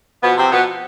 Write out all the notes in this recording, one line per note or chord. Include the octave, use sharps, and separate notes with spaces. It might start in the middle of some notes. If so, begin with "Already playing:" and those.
B2 F3 B3
C3 C4
B2 F3 B3